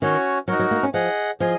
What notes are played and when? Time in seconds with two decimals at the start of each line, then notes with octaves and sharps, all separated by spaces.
0.02 D#3 C#4 F#4 C#5
0.48 F#3 D#4 F#4 A#4
0.59 F#3
0.71 A#3
0.83 C#4
0.94 F3 G#4 D#5 F#5
1.40 F3 G#4 D#5 G#5